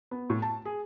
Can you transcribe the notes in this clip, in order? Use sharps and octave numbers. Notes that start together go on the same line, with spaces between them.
B3
A2
A5
G#4